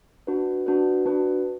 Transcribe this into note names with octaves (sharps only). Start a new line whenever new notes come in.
D4 F#4 B4
D4 F#4 B4
D4 F#4 B4